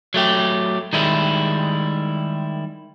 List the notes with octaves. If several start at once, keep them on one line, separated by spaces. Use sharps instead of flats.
F#3 A3 G4
D#3 G3 G#3 E4